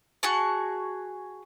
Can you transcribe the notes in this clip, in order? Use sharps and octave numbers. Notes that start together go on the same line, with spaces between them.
F#4 G#4 A5 C#6